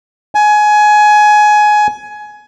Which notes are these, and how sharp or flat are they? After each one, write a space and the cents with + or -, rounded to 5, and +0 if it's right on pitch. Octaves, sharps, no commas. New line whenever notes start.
G#5 +20